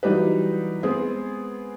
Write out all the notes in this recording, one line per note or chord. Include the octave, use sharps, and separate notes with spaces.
E3 F#3 G3 D#4 G4 B4
G#3 B3 C4 G#4